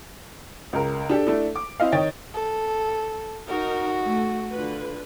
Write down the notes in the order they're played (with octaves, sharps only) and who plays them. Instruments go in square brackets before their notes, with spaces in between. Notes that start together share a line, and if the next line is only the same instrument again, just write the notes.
[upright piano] C#2 A#4
D4 G4 A4
A3 D4 E4
D6
C4 E4 D#5 F5
D#3 C#5 D#5 G5 A6
[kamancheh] A4
[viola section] D#4 A#4 [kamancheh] F#4
[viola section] A3
D3 F4 B4